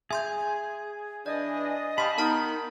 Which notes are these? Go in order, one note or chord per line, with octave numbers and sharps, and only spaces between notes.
G#4 E5 C6 G6
E3 D4 D5 D#5
G4 F5 A5 B5 C6 D#6
D#3 B3 D#4 A#4 A5 F6